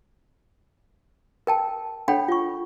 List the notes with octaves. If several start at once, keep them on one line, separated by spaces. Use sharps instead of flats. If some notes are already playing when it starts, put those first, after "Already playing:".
A#4 G5 A5
D4 A4 C#5 F#5 G5 B5
F4 C#6